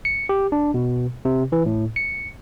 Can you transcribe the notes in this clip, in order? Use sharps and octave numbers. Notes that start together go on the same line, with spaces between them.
C#7
G4
D4
B2
C3
E3
A2
C#7